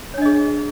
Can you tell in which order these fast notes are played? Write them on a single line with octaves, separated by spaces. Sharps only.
C#5 D4 D#5 G#4